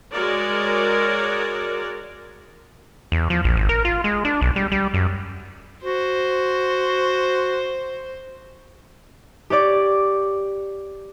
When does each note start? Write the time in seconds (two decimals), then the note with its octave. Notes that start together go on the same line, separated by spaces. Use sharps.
0.14 G#3 F#4 A#4 C#5 D5
3.12 E2
3.30 F3
3.44 A#1
3.56 G#1
3.69 A#4
3.85 F4
4.04 G#3
4.25 D4
4.41 B1
4.56 G3
4.72 G3
4.94 F#2
5.84 F#4 C5
9.50 G4 C#5 D5 D6